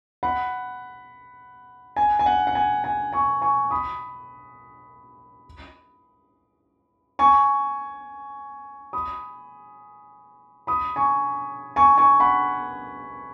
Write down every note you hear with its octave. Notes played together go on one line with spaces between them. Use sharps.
F#5 B5
G#5
G#5
F#5
F#5
G#5
G#5
G#5 C#6
G#5 C#6
B5 D#6
G#5 C#6
B5 D#6
B5 D#6
G#5 C#6
G#5 C#6
G#5 C#6
F#5 B5